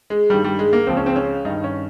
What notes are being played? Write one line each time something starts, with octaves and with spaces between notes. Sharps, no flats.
G#3
G2 D#3 G3
G3
G#3
A#3
C#2 C#3 F3 C4
C#4
C4
C#4
G2 D#3 D#4
C#4